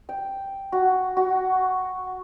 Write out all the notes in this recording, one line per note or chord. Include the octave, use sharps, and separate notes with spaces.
G5
F#4
F#4